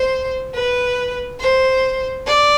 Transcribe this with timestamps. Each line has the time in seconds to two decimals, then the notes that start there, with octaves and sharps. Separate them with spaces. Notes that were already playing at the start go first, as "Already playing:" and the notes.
Already playing: C5
0.54 B4
1.40 C5
2.27 D5